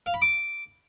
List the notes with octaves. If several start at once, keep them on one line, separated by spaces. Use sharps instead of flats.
F5
B5
D6